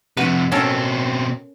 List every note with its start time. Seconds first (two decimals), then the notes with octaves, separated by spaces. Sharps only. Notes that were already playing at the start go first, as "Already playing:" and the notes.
0.17 F2 C3 F#4 B4
0.52 B2 C4 C#4 A4 A#4